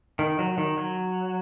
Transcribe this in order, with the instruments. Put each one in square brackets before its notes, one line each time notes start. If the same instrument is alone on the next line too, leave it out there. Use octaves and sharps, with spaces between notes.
[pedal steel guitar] D#3
F#3
D#3
F#3